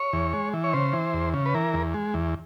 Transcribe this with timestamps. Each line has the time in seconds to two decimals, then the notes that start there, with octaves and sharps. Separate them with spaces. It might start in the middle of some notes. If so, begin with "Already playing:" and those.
Already playing: C#5
0.13 E2
0.33 G#3
0.53 E3
0.64 C#5
0.73 C#3 C5
0.93 E3
1.14 E2
1.34 C#3
1.46 B4
1.54 E3 A#4
1.74 E2
1.94 G#3
2.14 E2